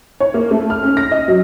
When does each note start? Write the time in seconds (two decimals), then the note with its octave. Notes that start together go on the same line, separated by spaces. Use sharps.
0.20 C#5
0.34 A#3
0.51 A3
0.70 F6
0.83 C#4
0.97 A#6
1.11 D#5
1.28 F#3